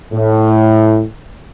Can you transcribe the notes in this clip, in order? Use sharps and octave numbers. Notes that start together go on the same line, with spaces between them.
A2